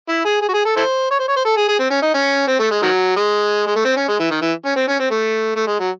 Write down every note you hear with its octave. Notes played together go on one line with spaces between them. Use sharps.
E4
G#4
G#4
F#4
G#4
A4
E4 A4 C5
C#5
C5
C#5
C5
A4
G#4
G#4
C4
C#4
D#4
C#4
C4
A3
G#3
D#3 F#3
G#3
G#3
A3
C4
C#4
G#3
E3
D#3
E3
C#4
C4
C#4
C4
A3
A3
G#3
F#3